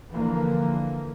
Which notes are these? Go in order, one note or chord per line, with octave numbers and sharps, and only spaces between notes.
D3 E3 F3 A#3